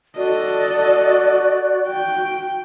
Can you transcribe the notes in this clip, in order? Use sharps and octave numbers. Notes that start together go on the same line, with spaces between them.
F#4 A4 D5 D#5
G5